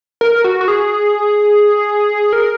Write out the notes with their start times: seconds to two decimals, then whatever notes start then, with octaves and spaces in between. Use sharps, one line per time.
0.21 A#4
0.44 F#4
0.61 F#4
0.68 G#4
2.33 A#4